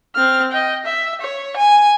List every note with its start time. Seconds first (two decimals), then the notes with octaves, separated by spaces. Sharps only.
0.15 C4 F6
0.51 D#5 G5
0.85 E5
1.21 C#5
1.57 G#5